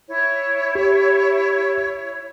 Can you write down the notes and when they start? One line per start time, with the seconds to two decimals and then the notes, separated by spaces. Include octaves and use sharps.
0.09 E4 C#5
0.75 G4